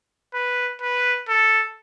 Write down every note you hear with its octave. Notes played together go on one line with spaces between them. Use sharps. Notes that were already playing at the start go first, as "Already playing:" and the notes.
B4
B4
A4